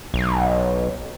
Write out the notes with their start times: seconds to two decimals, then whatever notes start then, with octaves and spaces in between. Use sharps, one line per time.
0.14 B1